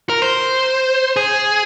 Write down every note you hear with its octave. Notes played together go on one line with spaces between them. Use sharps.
A#4
C5
G#4